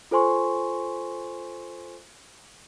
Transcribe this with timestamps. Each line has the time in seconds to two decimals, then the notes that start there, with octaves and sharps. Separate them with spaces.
0.11 F4 A4 C5 G#5 C6 C#6